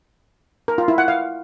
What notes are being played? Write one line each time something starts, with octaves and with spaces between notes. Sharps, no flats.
A#4
F4
E4
F#5
F5